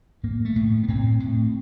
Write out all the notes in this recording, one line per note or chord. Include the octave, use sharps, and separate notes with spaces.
A2 A#3
A3
A2
B3
A2 C4
A2